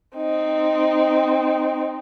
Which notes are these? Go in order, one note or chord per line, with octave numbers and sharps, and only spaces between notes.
C4 D#4